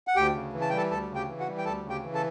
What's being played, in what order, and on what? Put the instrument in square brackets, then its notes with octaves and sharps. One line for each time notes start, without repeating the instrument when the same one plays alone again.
[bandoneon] F#5
D2 G4 G5
C#3
E3
A5
G3 G5
A4 A5
D2 A4 A5
C#3
G4 G5
E3
F#4 F#5
G3
G5
D2 A4 A5
C#3
G4 G5
E3
A4 A5